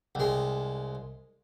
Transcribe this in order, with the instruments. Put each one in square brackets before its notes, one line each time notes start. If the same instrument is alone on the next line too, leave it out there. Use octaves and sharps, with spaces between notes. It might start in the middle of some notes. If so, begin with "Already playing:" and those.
[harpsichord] C2 G#3